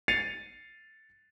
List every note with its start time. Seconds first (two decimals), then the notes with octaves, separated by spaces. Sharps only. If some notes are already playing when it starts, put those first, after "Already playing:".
0.08 A6 C7 C#7 D#7 F7